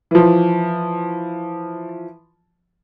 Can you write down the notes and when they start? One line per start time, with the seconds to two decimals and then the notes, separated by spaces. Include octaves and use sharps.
0.11 E3 F3